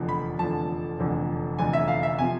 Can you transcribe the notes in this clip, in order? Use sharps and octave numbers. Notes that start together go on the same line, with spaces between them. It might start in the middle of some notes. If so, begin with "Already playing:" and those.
Already playing: F1 E2 D3 F3
B5
F1 E2 D3 F3 A5
F1 E2 D3 F3
F1 E2 D3 F3 G#5
E5
F5
E5
C3 F3 G#5